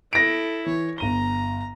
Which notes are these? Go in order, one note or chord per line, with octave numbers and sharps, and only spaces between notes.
E4 A4 A#6 D7
E3 C#5
G1 A#5 D#7 G7